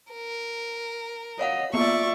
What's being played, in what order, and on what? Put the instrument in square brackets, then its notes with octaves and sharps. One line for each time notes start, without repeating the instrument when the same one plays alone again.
[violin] A#4
[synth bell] C#5 F5 F#5 [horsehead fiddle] D#5
[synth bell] A#3 B3 [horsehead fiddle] F4 E5 [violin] D5 C#6